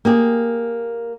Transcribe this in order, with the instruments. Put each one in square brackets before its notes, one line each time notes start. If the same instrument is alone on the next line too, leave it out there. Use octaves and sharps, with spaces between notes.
[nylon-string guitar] A#3 G4 G#4